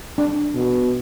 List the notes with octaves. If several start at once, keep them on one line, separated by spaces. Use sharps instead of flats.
D4
B2